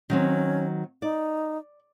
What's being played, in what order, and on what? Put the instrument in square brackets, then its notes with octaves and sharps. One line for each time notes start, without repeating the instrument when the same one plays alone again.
[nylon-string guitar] D#3 F#3 C4 [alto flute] C#4
[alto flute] D#4 [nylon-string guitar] D5